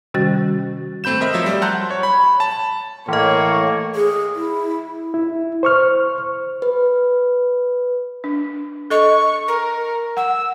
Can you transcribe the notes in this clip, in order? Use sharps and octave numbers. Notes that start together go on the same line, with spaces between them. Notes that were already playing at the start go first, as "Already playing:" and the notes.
C3 D#3 G3 C#4 F#4 A6
A3 C4 B5 G6 E7
A#4 C5 D#5 E5 A#5
F3 F#3 E5 E6 E7
G3
F#5 A5 A#5 C6 F#6 G6
C#5
B5
A5
A2 E3 A#3 C#5 D#5
G#4
E4
E4
C5 C#6 F6
B4
D4
A4 D#5 C#6
A#4
F#5 E6